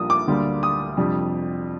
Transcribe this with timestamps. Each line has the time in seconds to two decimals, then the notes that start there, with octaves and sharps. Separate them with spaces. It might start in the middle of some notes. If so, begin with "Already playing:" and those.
Already playing: A#1 A#2 G3 A#3 D4 D#6
0.10 D6
0.28 D2 D3 G3 A#3
0.63 D#6
0.97 F2 C3 G3 D4